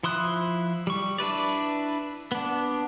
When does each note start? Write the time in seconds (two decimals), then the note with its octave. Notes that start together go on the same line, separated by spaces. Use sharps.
0.03 F3 E4 C6 D#6 F#6
0.87 G3 C#6
1.18 D4 E4 B4 D5
2.32 B3 D4